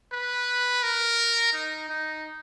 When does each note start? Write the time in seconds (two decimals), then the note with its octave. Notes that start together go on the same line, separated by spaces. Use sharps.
0.13 B4
0.83 A#4
1.53 D#4
1.89 D#4